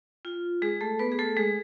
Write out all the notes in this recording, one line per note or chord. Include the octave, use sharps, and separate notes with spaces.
F4
G#3 G#4
A3 A4
B3 B4
G#4
A3 A4
G#3 G#4